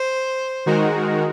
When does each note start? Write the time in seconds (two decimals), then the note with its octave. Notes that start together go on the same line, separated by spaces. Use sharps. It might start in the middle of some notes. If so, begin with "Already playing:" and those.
Already playing: C5
0.66 D#3 G#3 D#4 F#4 A#4